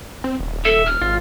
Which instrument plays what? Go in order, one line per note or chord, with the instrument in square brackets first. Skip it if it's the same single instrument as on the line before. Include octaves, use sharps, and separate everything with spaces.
[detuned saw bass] C4
D#1
[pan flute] A4 [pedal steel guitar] E5
[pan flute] F6
[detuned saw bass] G#1 [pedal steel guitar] F4